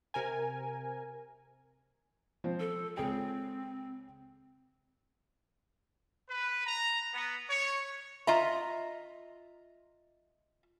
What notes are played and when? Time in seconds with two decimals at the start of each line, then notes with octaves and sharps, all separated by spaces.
0.14 C3 A#4 G#5
2.44 F3 C4
2.60 A4
2.97 C#2 C4 G#4 G5
6.28 B4
6.65 A#5
7.13 B3
7.49 C#5
8.27 F4 D#5 E5 A#5